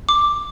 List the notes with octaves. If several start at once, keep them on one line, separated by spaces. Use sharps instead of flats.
D6